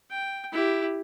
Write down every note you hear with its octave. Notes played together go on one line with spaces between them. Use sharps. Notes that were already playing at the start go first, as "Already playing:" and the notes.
G5
E4 G4